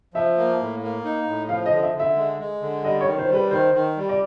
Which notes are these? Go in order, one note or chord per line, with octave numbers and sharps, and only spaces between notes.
F3 E5
A#3
A2
A#3
D#4
A2
F3 F5
D#5
D3
E5
D3
E5
G#3
G#3
D3
G3 D#5
C#5
D#3
C5
G3 B4
D#3 C5
D#3
G3
D5